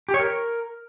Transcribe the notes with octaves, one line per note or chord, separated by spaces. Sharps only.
G4
C#5
A#4